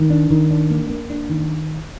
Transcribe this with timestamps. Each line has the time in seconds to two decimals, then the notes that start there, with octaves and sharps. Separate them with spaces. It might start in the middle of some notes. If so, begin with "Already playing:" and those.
Already playing: D#3
0.10 D4
0.31 D#3
0.50 D4
0.70 A#3
0.90 A#3
1.10 D4
1.30 D#3